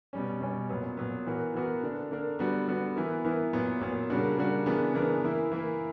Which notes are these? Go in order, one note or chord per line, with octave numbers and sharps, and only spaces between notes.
B2 G3 C#4
B2 G3 C#4
A#2 F#3 B3
A#2 F#3 B3
E3 B3 F#4 A#4
E3 B3 F#4 A#4
D3 A#3 D4 A#4
D3 A#3 D4 A#4
D3 G3 B3 F#4
D3 G3 B3 F#4
E3 B3 E4 A#4
E3 B3 E4 A#4
A#2 F#3 B3
A#2 F#3 B3
C#3 G3 A#3 D4 F#4
C#3 G3 A#3 D4 F#4
C#3 E3 B3 D4 A#4
C#3 E3 B3 D4 A#4
E3 A#3 E4
E3 A#3 E4